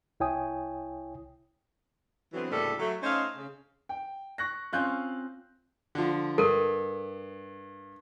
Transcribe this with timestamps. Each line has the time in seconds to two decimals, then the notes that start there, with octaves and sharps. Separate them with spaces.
0.20 C2 E4 C#5 G5 G#5 D#6
2.33 D3 E3 F#3 B3 C4
2.51 D2 A2 C#3 G3 A#3 A4
2.80 F#3 A3
3.03 A3 C#4 D#4 C5 D#5 F5
3.36 C#3
3.89 G5
4.38 C#6 F#6 A#6
4.73 C4 C#4 F4 F5 F#6 G6
5.95 D3 F3
6.38 G2 A4 A#4